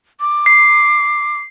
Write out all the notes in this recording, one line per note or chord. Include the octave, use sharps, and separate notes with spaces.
D6
C7